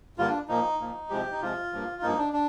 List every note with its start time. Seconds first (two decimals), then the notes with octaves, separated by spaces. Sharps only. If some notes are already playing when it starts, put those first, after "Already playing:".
0.17 G2 D3 G3 A#3 F4
0.28 D4
0.48 A#2 F3 A#3 D#4
0.79 A#2 F3 A#3
1.10 C3 F3 G#3 G4
1.32 D#4
1.41 C3 F3 G#3 F4
1.72 G2 F3 A#3
2.02 G2 F3 A#3 D#4
2.18 D4
2.33 D4